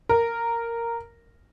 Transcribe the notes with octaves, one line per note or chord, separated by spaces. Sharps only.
A#4